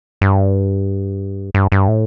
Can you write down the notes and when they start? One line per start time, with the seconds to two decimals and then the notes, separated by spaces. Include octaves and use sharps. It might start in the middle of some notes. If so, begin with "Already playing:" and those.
0.21 G2
1.54 G2
1.72 G2
1.88 A2